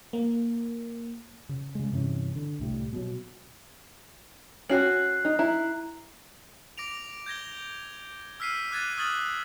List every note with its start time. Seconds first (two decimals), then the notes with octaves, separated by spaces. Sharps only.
0.13 A#3
1.49 C#3
1.75 C#3 G#3
1.92 G2 C3 E3 C#4
2.35 D3
2.59 C2 A2 G3
2.93 B2 F#3
4.70 C#4 F#4 F#6 C7 F#7
5.25 D#4
5.39 E4 A#5
6.78 D6 A#6 D7 F7
7.26 G6 G#6 A#6 G7
8.40 E6 F6 B6 C7 D#7
8.71 D6 F#6 G#6 A6 D#7
8.97 C#6 D#6 F6 G#6 A6 F#7